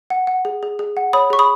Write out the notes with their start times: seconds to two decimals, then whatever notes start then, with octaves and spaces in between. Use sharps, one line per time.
0.10 F#5
0.27 F#5
0.45 G#4
0.63 G#4
0.79 G#4
0.97 F#5
1.13 C#5 B5 D#6
1.30 G#4 C#6
1.39 B5 D#6